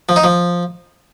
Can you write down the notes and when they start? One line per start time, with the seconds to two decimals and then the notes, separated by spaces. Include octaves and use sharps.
0.09 F3
0.16 D#4
0.24 F3